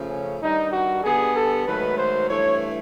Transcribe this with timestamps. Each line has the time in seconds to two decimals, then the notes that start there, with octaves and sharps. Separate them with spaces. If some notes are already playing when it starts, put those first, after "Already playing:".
Already playing: C#3 F3 A3
0.10 C#4
0.41 G2 D#3 G3 D#4
0.72 F#4
1.04 D3 G3 B3 G#4
1.36 A4
1.67 G#2 D#3 F#3 A3 B4
1.99 C5
2.29 G2 E3 A3 C#5